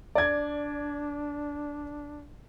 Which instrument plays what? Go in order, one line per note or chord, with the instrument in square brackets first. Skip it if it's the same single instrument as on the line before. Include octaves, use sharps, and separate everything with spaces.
[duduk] D4 [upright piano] D5 G#6